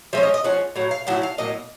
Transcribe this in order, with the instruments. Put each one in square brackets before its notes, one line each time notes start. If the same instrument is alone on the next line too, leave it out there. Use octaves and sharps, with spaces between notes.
[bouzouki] F3 G#3 C#4 E5
D#5
D#5
F3 G#3 C#4 F#5
A2 F#3 F#5
F5
A2 F#3 E4 F#5
F5
A2 F#3 A#3 D#5